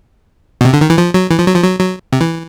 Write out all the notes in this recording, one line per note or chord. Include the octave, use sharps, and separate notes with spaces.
B2
C3
D3
D#3
E3
F3
F#3
E3
F3
F#3
F3
F#3
F#3
C3
E3